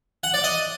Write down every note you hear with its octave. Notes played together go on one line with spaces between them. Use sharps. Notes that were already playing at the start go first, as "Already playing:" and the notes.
F#5
D5
D#5